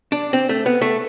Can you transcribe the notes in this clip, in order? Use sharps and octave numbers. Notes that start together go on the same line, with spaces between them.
D4
C4
A3
B3
A3